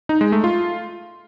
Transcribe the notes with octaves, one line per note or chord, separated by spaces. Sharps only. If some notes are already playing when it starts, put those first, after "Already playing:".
D#4
G#3
A3
F4